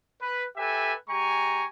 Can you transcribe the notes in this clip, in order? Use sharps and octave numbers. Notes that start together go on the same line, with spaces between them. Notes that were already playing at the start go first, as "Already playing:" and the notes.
B4
G4 A4 B4 E5 G#5
G#3 G4 G#5 A#5 C#6